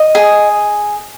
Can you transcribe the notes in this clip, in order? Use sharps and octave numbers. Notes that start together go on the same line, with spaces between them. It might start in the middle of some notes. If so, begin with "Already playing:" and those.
Already playing: D#5
G#4